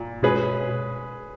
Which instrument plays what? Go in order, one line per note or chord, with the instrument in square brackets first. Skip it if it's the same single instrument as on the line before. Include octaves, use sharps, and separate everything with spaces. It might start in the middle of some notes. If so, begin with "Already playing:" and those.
Already playing: [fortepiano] A#2
[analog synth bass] B2 [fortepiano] G#3 C#4 G#4 B4